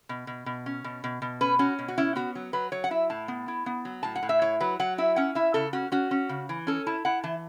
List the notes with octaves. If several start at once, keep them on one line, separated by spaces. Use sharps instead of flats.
B2
B2
B2
C#4
B2
B2
B2
C#4 B4
C#4 F#4
B2
F#4
C#4 E4
B3 F#4
F#3
F#3 B4
F#3 C#5
F#5
E4 E5
A2 A5
B3
E4
B3
F#3
A2 A5
F#5
A2
E5
E4 C#5
F#3 B4
F#3 F#5
E4 E5
C#4 F#5
E4 E5
C#3 A4
C#4 F#4
C#4 F#4
C#4
C#3
E3
C#4 A4
E4 A5
E4 F#5
E3 A5